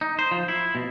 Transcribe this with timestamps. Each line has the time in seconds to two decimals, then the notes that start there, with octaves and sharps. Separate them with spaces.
0.01 D#4
0.19 C5
0.31 F3
0.48 E4
0.75 B2